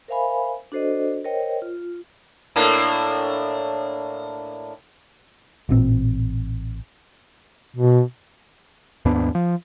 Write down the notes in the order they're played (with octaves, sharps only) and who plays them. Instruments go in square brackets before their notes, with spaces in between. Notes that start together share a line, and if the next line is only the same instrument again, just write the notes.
[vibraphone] A#4 C5 E5 F5 G#5 B5
D4 F#4 A4 C5 D5 D#5
A#4 C5 C#5 D#5 G5
F4
[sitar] A2 A#3 D4
[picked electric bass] A1 A#2 C4
[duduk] B2
[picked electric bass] D#2 G#2 B3 D4
F3